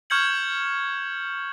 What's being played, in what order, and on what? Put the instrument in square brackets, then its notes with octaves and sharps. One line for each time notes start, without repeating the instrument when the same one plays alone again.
[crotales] C#6 F6 G6 G#6 C#7 F#7